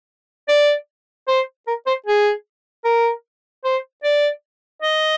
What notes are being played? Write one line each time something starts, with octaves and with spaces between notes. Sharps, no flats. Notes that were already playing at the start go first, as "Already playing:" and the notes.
D5
C5
A#4
C5
G#4
A#4
C5
D5
D#5